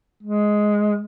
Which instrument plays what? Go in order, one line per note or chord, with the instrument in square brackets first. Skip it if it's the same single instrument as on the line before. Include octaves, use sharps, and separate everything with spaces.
[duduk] G#3